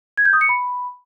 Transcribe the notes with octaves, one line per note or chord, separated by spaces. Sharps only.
G#6
G6
D#6
C#7
B5